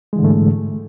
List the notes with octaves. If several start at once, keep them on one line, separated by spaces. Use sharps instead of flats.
G#2 D3 E3 G#3 A3